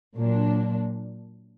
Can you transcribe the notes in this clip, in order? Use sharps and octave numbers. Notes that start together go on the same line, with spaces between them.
A#2 F#3 A#3 D4